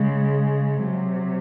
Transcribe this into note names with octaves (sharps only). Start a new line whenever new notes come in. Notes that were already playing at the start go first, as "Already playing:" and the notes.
Already playing: C#3 G#3
C3 F#3